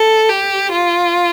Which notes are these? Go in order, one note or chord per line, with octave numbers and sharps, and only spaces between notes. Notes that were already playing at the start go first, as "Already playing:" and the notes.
Already playing: A4
G4
F4